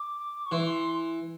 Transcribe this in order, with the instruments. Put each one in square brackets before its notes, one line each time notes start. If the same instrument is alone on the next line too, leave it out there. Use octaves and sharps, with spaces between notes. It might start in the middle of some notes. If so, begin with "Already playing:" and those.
Already playing: [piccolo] D6
C#6
[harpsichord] E3 [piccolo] C6